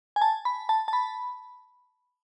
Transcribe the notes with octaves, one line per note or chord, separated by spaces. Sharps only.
G#5
A5
B5
A5
A5
B5